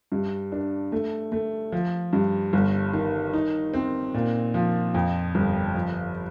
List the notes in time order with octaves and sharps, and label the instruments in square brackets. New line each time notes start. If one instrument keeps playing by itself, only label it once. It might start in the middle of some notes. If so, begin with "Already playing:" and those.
[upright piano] G2
D4
A3
A3
F3
G2
G1
D#3
D#4
C4
A#2
F3
F2
G1
F3